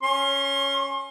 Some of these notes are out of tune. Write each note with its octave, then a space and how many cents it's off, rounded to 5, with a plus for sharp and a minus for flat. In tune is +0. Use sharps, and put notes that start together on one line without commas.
C#4 +0 C6 +40